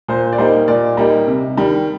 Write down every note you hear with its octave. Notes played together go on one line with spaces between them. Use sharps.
A#2 C5
D5
G3 A#3 D#4 C5
A#2 D5
G3 A#3 D#4
C3
D#3 G3